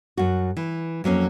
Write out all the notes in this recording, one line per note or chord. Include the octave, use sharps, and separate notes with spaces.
F#2 F#4
E3
F2 F#3 A#3 C#4